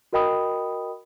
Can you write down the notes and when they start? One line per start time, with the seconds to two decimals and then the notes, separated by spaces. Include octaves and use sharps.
0.13 F#4 A#4 D#5 G5 B5 D#6